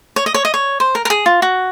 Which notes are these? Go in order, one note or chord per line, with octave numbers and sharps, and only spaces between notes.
C#5
D#5
C#5
D#5
C#5
C5
A#4
A#4
G#4
F4
F#4